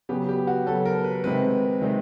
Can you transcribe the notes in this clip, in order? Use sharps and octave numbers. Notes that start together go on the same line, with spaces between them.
C#3 F#3 B3 G4
G4
F#4
C#3 F#3 B3 A4
A#4
B4
C3 D#3 G#3 C4 B4
C3 D#3 G#3 C4